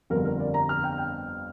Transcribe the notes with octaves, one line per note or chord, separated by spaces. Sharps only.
G1 F2 D3 G3 A#4
A#4
D5
A#5
F6
G5
G5